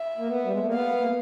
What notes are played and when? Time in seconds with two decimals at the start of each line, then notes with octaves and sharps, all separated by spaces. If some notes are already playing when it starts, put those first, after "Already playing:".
Already playing: E5
0.18 A#3
0.28 B3
0.45 G3
0.52 G#3
0.59 A3
0.66 A#3
0.73 B3 F5
1.00 A#3